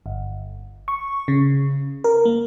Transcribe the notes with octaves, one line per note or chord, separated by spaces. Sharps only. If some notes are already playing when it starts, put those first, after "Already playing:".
G1
C#6
C#3
A#4
A#3